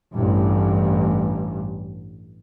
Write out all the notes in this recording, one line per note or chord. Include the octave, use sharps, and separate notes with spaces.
A1 G2